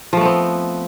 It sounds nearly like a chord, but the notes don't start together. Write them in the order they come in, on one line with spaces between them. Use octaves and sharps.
F3 A3 B3 C4